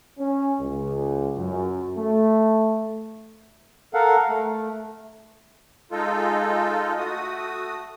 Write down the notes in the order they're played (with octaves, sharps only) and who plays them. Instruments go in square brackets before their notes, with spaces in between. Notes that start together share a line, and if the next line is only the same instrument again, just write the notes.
[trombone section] C#4
C#2
F#2
A3
[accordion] A4 A#4 F5 F#5
A3
G#3 D#4 F4 A4
A3 F#4 D#6